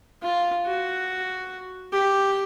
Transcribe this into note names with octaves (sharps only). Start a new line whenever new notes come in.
F4
F#4
G4